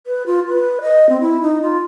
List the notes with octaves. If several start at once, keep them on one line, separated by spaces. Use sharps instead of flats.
B4
F4
B4
D#5
C4
E4
D#4
F4